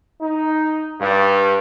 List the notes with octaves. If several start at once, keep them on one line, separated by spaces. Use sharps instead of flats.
D#4
G2